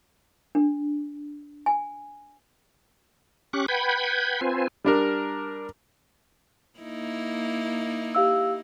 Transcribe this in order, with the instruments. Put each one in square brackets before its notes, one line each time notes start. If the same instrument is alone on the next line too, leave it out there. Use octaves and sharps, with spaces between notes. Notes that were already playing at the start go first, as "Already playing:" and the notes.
[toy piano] D4
G#5
[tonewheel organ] C#4 G4 C#6 D6 F#6
B4 F#5 G5 B5 G6 G#6
C4 F4 B4 C5 G#5
[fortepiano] G3 D4 A#4
[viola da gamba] A#3 D#4 E4
[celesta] G4 F5 E6